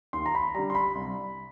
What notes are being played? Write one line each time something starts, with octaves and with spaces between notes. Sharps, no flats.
D#2 C6
A#5
B5
D3 G3 A#5
C6
B5
C2